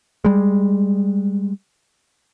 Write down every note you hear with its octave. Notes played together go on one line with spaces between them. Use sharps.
G3 G#3